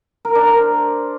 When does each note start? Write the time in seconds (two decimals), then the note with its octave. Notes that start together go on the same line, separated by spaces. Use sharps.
0.25 A#4
0.35 D4
0.46 A#4
0.56 C5